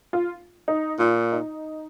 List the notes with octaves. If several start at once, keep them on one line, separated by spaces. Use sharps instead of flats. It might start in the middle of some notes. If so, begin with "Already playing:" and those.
F4
D#4
A#2 F4
D#4